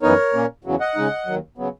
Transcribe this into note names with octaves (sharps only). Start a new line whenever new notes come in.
F#2 E3 B3 D#4 A#4 C#5
A#2 A#3 C#4
E2 C#3 F#3
D#5 F#5
C#3 G#3 D#4
D#2 D#3 F#3
C#3 F#3 B3